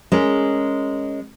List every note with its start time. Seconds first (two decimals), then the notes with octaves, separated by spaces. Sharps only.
0.12 G#3 C#4 A#4